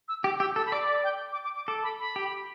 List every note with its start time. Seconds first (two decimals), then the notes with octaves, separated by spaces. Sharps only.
0.08 E6
0.24 G4 D6
0.40 G4 E6
0.56 A4 E6
0.66 B5
0.72 D5 D6
0.88 D6
1.03 G5
1.32 D6
1.44 D6
1.56 D6
1.68 A4 D6
1.83 B5
1.99 B5
2.16 G4